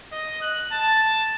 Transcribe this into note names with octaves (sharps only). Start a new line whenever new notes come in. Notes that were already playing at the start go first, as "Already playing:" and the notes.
D#5
F#6
A5